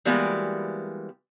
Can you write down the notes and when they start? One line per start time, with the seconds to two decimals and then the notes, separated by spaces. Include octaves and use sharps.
0.05 E3 G3 G#3 A#3 B3 F#4